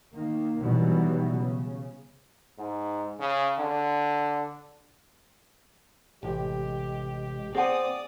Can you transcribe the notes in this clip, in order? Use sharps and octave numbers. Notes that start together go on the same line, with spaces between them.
D#3 A#3
B2 D#3 E3 F#3 G3 B3
C#3
G#2
C#3
D3
A1 C3 G#3 G4
C4 G#4 D5 F#5 G#5 D#6